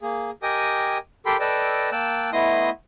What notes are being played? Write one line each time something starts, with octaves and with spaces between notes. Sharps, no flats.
A#3 G#4
G4 A#4 D#5 G5 G#5 D#6
G4 A4 A#4 G5 B5 C6
A4 B4 D5 D#5 G5 E6
A#3 G5 A5 E6 F#6
A3 B3 E4 D#5 C6 D#6